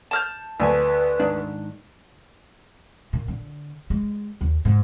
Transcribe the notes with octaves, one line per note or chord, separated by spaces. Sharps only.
A5 F6 G6
D2 B4 G#5
G#2 D#3 D4
A#2
D3
G#3
D#2
G#2